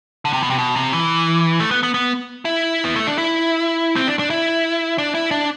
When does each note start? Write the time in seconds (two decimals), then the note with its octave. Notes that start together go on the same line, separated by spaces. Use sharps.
0.25 D3
0.33 C3
0.43 B2
0.50 C3
0.58 B2
0.76 C3
0.93 E3
1.60 A3
1.71 B3
1.83 B3
1.94 B3
2.45 E4
2.85 B3
2.96 A3
3.07 D4
3.18 E4
3.96 C4
4.07 D4
4.19 D4
4.30 E4
4.98 D4
5.14 E4
5.31 D4